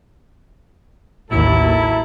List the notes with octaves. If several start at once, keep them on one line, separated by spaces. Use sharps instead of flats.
A1 D#2 F#3 E4 A4